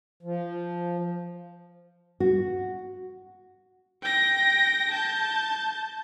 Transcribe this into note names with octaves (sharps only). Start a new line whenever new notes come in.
F3
F#4
G5 A#6
A5 G6